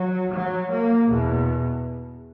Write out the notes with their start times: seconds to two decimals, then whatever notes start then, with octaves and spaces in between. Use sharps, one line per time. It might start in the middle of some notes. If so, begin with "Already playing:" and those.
Already playing: F#3
0.34 F#3
0.72 A#3
1.10 E2 B2